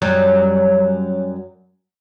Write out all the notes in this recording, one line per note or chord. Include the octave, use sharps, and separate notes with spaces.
F#2 F#3 G3